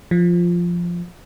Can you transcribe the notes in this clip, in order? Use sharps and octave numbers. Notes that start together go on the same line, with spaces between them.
F3